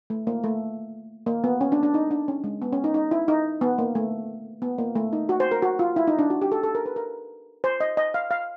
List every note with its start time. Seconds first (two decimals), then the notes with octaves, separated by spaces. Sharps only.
0.10 A3
0.27 A#3
0.44 A3
1.26 A#3
1.44 B3
1.61 C#4
1.72 D4
1.83 D4
1.94 D#4
2.11 D4
2.28 C#4
2.44 G#3
2.62 B3
2.73 C#4
2.84 D#4
2.94 D#4
3.11 E4
3.28 D#4
3.61 B3
3.78 A#3
3.95 A3
4.62 B3
4.78 A#3
4.95 A3
5.13 D#4
5.29 F#4
5.40 C5
5.51 A#4
5.62 F#4
5.79 F4
5.96 E4
6.08 D#4
6.19 D4
6.30 F#4
6.42 G4
6.52 A4
6.63 A4
6.75 A#4
6.86 B4
6.96 A#4
7.64 C5
7.80 D#5
7.97 D#5
8.14 F5
8.31 F5